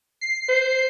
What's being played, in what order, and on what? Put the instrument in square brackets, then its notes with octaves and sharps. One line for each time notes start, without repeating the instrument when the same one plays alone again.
[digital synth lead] C7
[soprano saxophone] C5